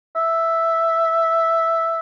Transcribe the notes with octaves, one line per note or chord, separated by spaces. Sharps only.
E5